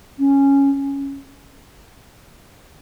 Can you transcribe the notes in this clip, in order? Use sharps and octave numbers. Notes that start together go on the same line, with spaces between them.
C#4